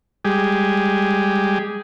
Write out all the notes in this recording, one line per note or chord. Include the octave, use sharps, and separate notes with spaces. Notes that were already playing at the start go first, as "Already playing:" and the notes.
G3 G#3 G4 G#4